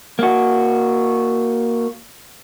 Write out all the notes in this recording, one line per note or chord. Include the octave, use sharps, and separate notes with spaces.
A#3 F#4